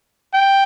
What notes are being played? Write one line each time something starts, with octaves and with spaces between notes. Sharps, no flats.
G5